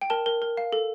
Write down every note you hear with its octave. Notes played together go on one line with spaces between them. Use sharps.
G5
A#4 A5
A#4
A#4
F5
A4